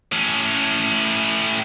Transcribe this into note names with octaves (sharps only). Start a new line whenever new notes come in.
A2 C#4